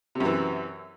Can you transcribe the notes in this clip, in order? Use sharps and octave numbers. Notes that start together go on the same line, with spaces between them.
F#2 C3 E3